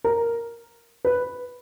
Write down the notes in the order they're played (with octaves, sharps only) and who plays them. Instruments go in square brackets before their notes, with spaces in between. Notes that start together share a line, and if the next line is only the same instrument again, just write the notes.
[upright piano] A#4
B4